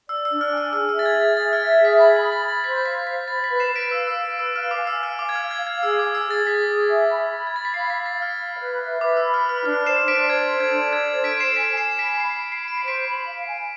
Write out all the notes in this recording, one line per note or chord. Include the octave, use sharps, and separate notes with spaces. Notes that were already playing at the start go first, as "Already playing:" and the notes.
D5 E6
E6
D4
F6
G#5 E6
G#4 E6
E6
E5 A6
G#6
G#4
G#6
E5 A6
F6
E5
G#6
G#4
B6
B5 A6
B6
B5
A6
B5
A6
C5 B6
F5 B6
C5 B6
B5 A6
B6
B4
C7 E7
B4
B6 D7
F5 E6
E6
B4
B4
E6
F5 F6
D6
G#5
E6
F5
F6
F5 D6
G#6
F5 F6
G#6
F5
G#6
G#4 E6
D6
G#4
E6
G#4
A6
G#4 B6
G#4
E5
B5
B5
G#6
B5 A6
B6
F5 C7
B6
F5
A6
F5
F6
B5
B4
E5
B4 D6
E6
B5
F6
B4 F6
D4 F6
C5 C7 E7
D4 B6 D7
C5 G#6
A4
G#6
D4
A4 G#6
C5
B6 D7
A4 D7
C7 E7
G#5 B6 D7
G#5 C7 E7
E7
B5 B6 D7
B5 C7
B5 C7
C7
B5
D7
C7
C5 B6 D7
B5
F5
G#5